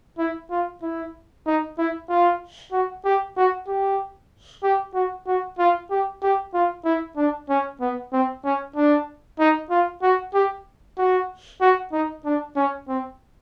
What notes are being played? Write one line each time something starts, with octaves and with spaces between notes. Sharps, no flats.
E4
F4
E4
D#4
E4
F4
F#4
G4
F#4
G4
G4
F#4
F#4
F4
G4
G4
F4
E4
D4
C#4
B3
C4
C#4
D4
D#4
F4
F#4
G4
F#4
F#4
D#4
D4
C#4
C4